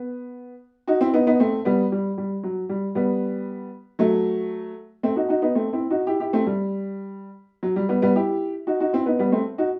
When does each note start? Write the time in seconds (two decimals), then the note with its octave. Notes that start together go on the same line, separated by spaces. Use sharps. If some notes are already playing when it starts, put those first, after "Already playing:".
Already playing: B3
0.88 D#4 F#4
1.01 C4 E4
1.14 B3 D#4
1.27 B3 D#4
1.40 A3 C4
1.65 G3 B3
1.92 G3
2.18 G3
2.43 F#3
2.69 G3
2.95 G3 B3
3.99 F#3 A3
5.03 A3 C4
5.16 D#4 F#4
5.29 D#4 F#4
5.42 B3 D#4
5.55 A3 C4
5.73 C4 E4
5.90 D#4 F#4
6.07 E4 G4
6.20 E4 G4
6.33 A3 C4
6.47 G3
7.63 F#3
7.76 G3
7.89 G3 B3
8.02 G3 B3
8.16 E4 G4
8.67 D#4 F#4
8.80 D#4 F#4
8.93 C4 E4
9.06 B3 D#4
9.19 G3 B3
9.32 A3 C4
9.58 D#4 F#4